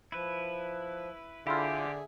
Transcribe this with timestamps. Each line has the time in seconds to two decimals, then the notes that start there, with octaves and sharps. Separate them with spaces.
0.12 F3 E4 B4
1.47 D3 E4 F4 G4 G#4 C5 E5 G#5